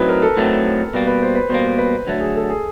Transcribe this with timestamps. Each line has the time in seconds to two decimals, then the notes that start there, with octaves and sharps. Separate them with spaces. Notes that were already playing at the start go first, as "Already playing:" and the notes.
Already playing: A2 F#3 A3 C4 D#4 B4
0.09 A#4
0.22 A4
0.36 A2 F#3 A3 C4 D#4
0.94 B2 G3 A#3 B4
1.07 B4
1.22 C5
1.35 B4
1.49 B2 G3 A#3 C5
1.78 B4
2.07 D3 F#3 A3
2.20 G#4
2.35 A4
2.50 G#4